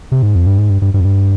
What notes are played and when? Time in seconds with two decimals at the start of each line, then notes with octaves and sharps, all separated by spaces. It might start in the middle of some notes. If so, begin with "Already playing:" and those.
0.12 C3
0.22 G#2
0.35 F2
0.47 G2
0.58 G#2
0.70 G2
0.82 G2
0.94 G2
1.00 F2
1.05 G2